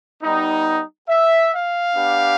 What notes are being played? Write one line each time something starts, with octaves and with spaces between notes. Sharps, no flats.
G3 B3 D#4
E5
F5
B3 D4 G4